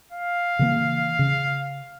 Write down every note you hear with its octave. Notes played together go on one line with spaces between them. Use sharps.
F5
C#3 E3 A#3
C#3